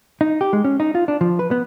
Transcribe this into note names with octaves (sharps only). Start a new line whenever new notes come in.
D#4
G4
G#3
C#4
D#4
F4
D4
F3
B4
B3